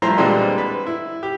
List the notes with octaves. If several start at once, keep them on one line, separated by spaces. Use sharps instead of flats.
G2 F3 A3 E4 C5 A#5
A#2 D3 E3 G3 G#3 C4
B4
E4
G4